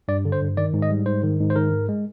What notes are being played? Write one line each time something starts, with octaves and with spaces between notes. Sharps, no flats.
G2 D5
D3
C5
G2
D#3 D5
G#2
D#5
G3
G#2 C5
D#3
G#2
C5
D#3 A#4
G#2
G#3